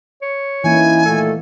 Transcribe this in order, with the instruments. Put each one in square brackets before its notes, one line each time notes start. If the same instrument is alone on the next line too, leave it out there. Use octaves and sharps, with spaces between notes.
[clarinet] C#5
[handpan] E3 A#3 [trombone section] C#4 D#4 E4 [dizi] G#5
[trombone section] A#2 D#3 A3 [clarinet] A4